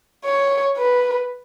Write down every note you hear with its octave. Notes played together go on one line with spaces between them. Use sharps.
C#5
B4